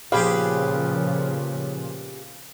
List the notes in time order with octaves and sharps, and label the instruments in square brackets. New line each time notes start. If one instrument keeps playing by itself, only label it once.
[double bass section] A#2 C#3 F3 [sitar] B3 G4 G#4 [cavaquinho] B4 [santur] F5